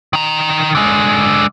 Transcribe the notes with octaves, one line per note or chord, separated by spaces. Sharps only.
D#3 A#5
D3 G#3